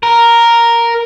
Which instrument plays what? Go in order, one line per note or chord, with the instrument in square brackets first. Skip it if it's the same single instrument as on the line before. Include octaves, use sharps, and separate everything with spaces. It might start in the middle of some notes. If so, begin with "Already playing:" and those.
[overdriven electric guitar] A#4